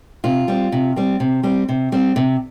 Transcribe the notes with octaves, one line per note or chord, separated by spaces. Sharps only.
C3 F4
G3 C4
C3
G3 C4
C3
G3 C4
C3
G3 C4
C3